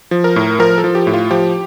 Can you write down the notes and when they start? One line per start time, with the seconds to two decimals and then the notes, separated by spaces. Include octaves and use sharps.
0.11 F3
0.24 A#4
0.36 A2
0.59 F3 A#4
0.78 A4
0.84 F3
0.95 G4
1.07 A2
1.13 F4
1.31 F3 G4